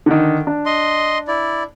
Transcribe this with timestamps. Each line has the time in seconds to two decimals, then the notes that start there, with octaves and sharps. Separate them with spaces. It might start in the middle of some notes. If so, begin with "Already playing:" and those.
0.06 D3 D#3
0.47 D4
0.66 D#5 C6
1.28 E4 D5